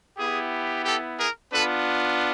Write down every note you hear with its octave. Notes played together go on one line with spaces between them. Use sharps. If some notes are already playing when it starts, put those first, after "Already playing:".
B3 E4 G4 G#4
G4 A4
G#4 A#4
B3 D4 F4 A4 B4